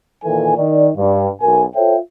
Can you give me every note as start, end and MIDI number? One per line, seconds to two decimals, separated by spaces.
0.25 0.53 46
0.25 0.53 51
0.25 0.53 52
0.25 0.53 69
0.25 0.53 80
0.57 0.90 51
0.57 0.90 63
0.57 0.90 74
0.96 1.29 43
1.42 1.62 35
1.42 1.62 47
1.42 1.62 70
1.42 1.62 80
1.75 1.96 65
1.75 1.96 69
1.75 1.96 72
1.75 1.96 73
1.75 1.96 76
1.75 1.96 79